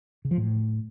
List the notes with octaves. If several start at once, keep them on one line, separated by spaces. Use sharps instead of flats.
C#3
F3
A2